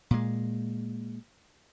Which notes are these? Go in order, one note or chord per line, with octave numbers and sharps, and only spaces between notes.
A#2 G#3